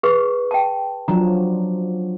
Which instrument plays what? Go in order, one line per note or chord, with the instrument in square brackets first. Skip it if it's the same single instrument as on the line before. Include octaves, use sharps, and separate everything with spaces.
[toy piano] G#4 B4 C#6
G5 A5
[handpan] F3 F#3 D4 [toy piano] A#5